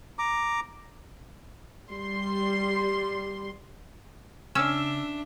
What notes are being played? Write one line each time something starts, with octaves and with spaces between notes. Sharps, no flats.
A#5 D6
G3 C6
C#3 C#4 D4 E5 E6